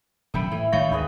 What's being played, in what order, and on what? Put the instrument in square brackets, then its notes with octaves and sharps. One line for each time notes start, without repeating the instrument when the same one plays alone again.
[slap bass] D#1 F#2 C#3 [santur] E5 G5 B5
[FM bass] A2 [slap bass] E3 [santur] E4
[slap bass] G#1 G#2 D#3 [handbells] A3 F5 [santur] C#5
[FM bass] D2 [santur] G#4 B4 G5